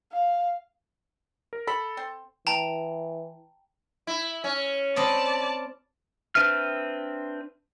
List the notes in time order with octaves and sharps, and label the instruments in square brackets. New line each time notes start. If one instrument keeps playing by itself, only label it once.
[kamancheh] F5
[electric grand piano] A#4
[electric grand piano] A4 [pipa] B5
[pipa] C4
[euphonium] E3 [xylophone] G5 A5 A#5
[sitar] E4
C#4
[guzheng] C4 D#5 B5 [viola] D5 A5
[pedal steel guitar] C4 D4 B4 E5 F6